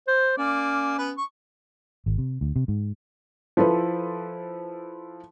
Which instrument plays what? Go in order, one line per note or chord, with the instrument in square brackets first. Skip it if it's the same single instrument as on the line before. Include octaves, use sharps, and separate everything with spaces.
[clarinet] C5
[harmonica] A#3 D5 [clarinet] C#4
[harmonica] B3 B4
C#6
[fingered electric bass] G#1
C3
D2
C3
G#2
[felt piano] F3 E4 A4 B4 C5